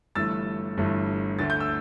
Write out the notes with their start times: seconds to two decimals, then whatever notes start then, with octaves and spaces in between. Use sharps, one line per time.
0.15 G1 G2 E3 A3 E6 A6
0.77 G1 G2 E3 A3
1.39 D2 D3 A3 A6
1.50 G6
1.60 E6